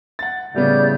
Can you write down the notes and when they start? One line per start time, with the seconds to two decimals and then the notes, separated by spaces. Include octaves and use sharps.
0.19 F#5 A6
0.54 A2 C#3 G3 B3 D5 G6